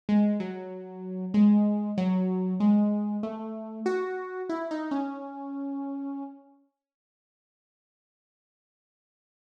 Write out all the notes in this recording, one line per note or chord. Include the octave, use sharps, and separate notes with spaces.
G#3
F#3
G#3
F#3
G#3
A3
F#4
E4
D#4
C#4